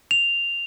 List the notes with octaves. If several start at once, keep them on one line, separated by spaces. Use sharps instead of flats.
F7